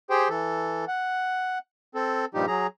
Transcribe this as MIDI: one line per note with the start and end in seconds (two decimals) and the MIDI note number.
0.10 0.28 67
0.10 0.28 68
0.10 0.28 72
0.10 0.28 79
0.29 0.85 52
0.29 0.85 69
0.88 1.58 78
1.95 2.25 60
1.95 2.25 69
2.34 2.46 43
2.34 2.46 46
2.34 2.46 53
2.34 2.46 55
2.34 2.46 63
2.34 2.46 67
2.47 2.67 54
2.47 2.67 68
2.47 2.67 82